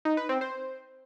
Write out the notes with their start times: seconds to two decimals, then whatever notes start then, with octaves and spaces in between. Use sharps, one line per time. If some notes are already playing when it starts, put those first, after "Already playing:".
0.05 D#4
0.17 B4
0.29 C4
0.41 C5